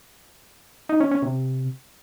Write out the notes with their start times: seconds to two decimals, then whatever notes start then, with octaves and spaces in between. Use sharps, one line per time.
0.89 D#4
1.00 C#4
1.11 C#4
1.22 C3